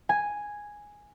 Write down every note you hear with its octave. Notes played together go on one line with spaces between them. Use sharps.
G#5